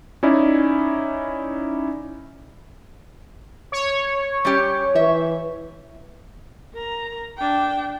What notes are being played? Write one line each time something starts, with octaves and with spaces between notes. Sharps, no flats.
C#4 D#4 E4 D5
C#5
G3 C#4 G4
E3 E5
A#4 A#5
D4 G5